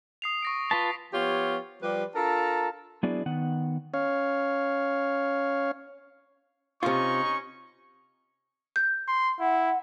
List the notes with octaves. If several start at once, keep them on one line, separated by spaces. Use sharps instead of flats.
D#6 C7 F7
C#6 A#6 D7
F4 B4 A5 B6
F3 B3 F4 G4 C#5
F3 G3 G4 B4 D5
D4 F4 A4 A#4 A5 A#5
F#3 B3 D4 E4 G#4 D5
D#3 B3 F#5
C#4 C#5 F5
C3 C#4 D#4 F4 C#6
G6
C6
E4 F#5